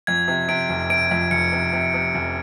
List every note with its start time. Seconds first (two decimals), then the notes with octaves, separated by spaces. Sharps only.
0.07 F2 G#6
0.28 C3
0.48 C3 D7
0.69 F1
0.90 C3 D7
1.11 F2
1.31 F1 C#7
1.52 C3
1.73 C3
1.94 C3
2.15 F1